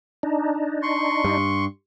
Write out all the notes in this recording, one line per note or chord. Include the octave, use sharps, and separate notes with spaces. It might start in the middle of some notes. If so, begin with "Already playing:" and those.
D4 D#4
C6 C#6
G2